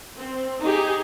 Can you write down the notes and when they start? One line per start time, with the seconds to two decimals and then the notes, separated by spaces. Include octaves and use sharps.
0.16 C4
0.60 D#4 G4 G#4